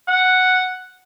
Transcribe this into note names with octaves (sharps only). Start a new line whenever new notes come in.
F#5